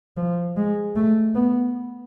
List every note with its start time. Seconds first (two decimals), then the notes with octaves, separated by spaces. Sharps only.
0.17 F3
0.56 G#3
0.96 A3
1.35 B3